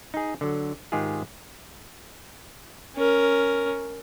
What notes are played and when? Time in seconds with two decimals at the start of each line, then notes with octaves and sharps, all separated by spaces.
0.14 D#4 G#4
0.41 D3 F#3
0.92 G#2 D#3 G#3 F4 G4 G#4
2.96 C#4 A#4